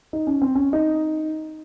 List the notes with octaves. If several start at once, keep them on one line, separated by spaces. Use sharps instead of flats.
D#4
C#4
C4
C#4
D#4